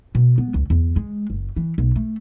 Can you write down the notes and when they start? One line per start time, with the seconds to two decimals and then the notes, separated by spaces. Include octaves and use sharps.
0.15 B2
0.38 B3
0.54 C#2
0.70 E2
0.96 G#3
1.30 F#1
1.57 E3
1.78 B1
1.96 A3